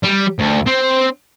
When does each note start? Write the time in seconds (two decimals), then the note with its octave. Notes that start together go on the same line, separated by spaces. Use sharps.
0.03 G3
0.39 D2
0.66 C4